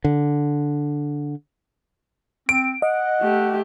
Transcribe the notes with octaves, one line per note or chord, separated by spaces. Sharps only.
D3
C4 D7
D#5 F#5
A3 G4